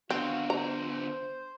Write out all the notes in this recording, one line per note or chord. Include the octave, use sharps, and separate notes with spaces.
D3 B3 C4 F#4 F5
C5 A#5